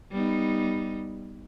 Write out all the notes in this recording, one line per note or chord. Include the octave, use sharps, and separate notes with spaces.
G3 B3 D#4